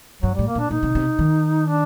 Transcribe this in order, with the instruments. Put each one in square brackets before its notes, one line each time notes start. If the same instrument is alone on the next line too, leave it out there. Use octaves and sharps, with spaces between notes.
[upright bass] G2 [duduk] F#3
[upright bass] A2 [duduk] G3
[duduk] A#3
[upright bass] A#2 [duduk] D4
[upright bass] A#2 [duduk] D#4
[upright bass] C3
C3
D#3
[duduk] D4